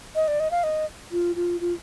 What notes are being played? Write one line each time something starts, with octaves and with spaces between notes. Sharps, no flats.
D#5
D5
D#5
F5
D#5
F4
F4
F4